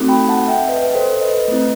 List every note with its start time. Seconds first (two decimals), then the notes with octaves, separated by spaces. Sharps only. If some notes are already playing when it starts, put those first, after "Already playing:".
Already playing: A3 C4 D#4 F#4 A4
0.09 G5 B5
0.29 F#5 A5
0.48 E5 G5
0.68 B4 D#5
0.94 A4 C5
1.21 B4 D#5
1.48 A3 C4 E4